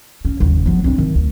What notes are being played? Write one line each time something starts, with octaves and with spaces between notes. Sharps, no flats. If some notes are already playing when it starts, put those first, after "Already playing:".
C#4
F#1 D#2
F3 B3
C4 D4
D#3
D2